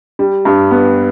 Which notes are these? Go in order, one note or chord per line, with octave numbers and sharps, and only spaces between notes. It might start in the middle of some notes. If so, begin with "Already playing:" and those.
G3
G2
B3